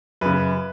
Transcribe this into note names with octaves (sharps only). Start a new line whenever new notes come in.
F#2 C#3 B4